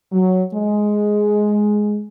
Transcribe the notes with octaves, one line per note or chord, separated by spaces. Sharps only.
F#3
G#3